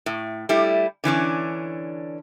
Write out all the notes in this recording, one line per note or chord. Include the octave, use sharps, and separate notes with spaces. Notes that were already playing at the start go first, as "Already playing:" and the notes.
A2
G3 A3 E4
D3 E3 C#4 D4